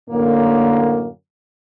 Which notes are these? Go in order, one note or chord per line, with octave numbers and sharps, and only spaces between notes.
F#2 A2 D3 A#3